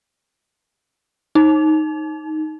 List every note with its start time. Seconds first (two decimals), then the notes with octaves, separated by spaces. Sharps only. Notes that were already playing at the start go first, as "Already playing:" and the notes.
1.35 D#4